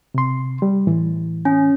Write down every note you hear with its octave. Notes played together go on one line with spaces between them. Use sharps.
C3 C6
G3
A2 E3
C#4